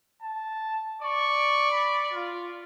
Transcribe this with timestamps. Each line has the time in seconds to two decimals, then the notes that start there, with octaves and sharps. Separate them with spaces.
0.22 A5
1.02 D5 C#6
1.71 B5
2.14 F4